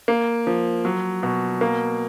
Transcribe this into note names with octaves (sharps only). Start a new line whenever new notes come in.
A#3
F3
F#3
B2
A#3